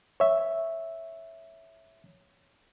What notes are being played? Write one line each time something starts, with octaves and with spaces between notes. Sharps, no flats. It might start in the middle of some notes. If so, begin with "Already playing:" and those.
C#5 E5